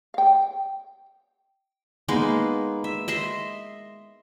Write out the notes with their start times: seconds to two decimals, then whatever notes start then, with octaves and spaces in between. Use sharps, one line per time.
0.14 F5 G5
2.08 G#3 A#3 B3 D#4
2.84 E5
3.08 D#5 E5 C6